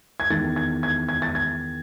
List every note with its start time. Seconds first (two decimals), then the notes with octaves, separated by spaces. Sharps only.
0.20 G#6
0.30 E2 D#3 A6
0.56 G#6
0.83 G#6
1.09 G#6
1.22 A6
1.35 G#6